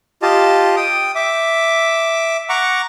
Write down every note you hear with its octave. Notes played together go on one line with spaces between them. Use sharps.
F4 G4 D#5 A5
G5 D#6
E5 D6
F#5 A#5 C#6 D6